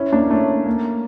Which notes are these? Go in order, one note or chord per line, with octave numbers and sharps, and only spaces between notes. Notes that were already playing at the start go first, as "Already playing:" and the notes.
Already playing: C#4 E4
A#3 D4
A3 C#4
A#3